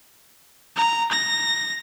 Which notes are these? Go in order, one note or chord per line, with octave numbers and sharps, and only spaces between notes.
A#5
A#6